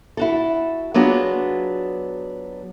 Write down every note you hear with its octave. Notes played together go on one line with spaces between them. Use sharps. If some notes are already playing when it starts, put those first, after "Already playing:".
E4 F#4 A4
F#3 B3 D4 F4 F#4 G#4